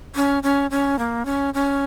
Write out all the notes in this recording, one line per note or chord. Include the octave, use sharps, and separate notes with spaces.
C#4
C#4
C#4
A#3
C#4
C#4